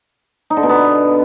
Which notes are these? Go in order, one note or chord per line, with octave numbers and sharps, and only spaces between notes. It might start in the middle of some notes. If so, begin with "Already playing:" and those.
D#4
D3
B2
B3